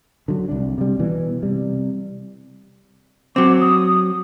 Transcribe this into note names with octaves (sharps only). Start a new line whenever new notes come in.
D3 F#3
C2 D4
C3 G3
B2 E3
C3 G3
F#3 C4 D6
D#6